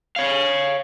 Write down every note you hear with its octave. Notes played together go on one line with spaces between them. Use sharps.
C#5 F5